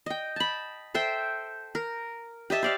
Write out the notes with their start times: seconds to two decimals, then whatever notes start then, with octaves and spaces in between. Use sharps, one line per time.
0.06 D#5 G5
0.36 A5 B5
0.94 A4 C5 E5 G5
1.75 A#4
2.50 G4 D#5 E5 A5
2.63 C5 D5 F5